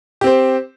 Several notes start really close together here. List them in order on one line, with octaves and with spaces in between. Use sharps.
G4 C4 C5